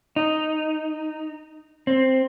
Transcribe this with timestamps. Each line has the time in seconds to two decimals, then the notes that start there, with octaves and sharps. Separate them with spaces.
0.16 D#4
1.87 C4